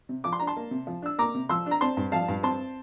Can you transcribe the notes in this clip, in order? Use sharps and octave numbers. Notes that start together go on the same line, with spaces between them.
C3
F3 D6
C6
D4 A#5
A5 C6
A#3
C3
F3
D4 E6
A#3 A#5 D6
C3
F3 C6 E6
D4
A#5
C4 A5 C6
G2
F3 F5 A5
G2
C4 A5 C6